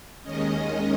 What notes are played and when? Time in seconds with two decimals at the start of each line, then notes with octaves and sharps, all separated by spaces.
0.23 D#2 D#3 G#3 C#4 D#5